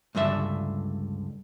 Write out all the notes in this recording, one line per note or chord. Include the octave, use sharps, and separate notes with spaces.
C#2 G2 D3 E5